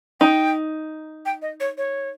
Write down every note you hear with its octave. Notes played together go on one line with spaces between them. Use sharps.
D#4 G5
G5
D#5
C#5
C#5